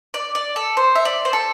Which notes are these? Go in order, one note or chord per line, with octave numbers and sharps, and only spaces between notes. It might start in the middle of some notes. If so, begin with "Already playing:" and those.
D5
D5
A4
C5
E5
D5
C5
A4